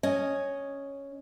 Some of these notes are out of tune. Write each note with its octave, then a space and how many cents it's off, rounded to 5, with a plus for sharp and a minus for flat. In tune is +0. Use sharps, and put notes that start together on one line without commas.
C#4 +0 D#5 -5